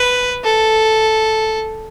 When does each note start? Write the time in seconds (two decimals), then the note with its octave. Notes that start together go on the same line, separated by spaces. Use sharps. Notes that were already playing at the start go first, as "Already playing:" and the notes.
Already playing: B4
0.44 A4